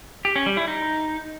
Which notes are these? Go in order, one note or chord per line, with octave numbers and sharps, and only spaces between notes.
G4
C#4
G3
E4
D#4